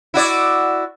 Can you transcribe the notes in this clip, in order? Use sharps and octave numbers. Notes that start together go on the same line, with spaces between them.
E4 F#4 D5